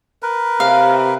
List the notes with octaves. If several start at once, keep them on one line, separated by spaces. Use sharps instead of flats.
A#4 B4
C3 F5